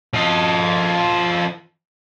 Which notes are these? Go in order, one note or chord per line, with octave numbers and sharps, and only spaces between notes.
F3 D#5